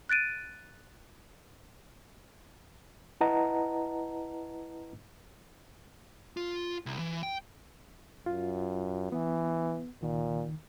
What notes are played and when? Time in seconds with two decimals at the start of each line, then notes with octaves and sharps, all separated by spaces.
0.09 F#6 A6 D7 D#7
3.21 E4 B4 D#5 F#5 A5 A#5
6.37 F4
6.86 C2
6.99 E3
7.23 G5
8.26 F#2 F4
9.12 E3 B3
10.02 C#2 A#2 D#3